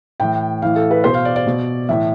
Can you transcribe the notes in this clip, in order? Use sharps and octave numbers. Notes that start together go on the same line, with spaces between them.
A2 E3 G5
A2 E3 F5
A4
B4
B2 C5
F5
D5
D5
B2
A2 E3 E5